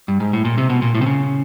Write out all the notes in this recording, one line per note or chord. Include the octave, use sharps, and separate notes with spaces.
G2
G#2
A2
A#2
C3
B2
A#2
A2
C3
C#3